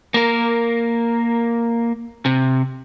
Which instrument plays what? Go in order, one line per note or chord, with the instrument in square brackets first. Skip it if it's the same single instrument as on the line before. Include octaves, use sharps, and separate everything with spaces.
[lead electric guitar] A#3 A#4
C3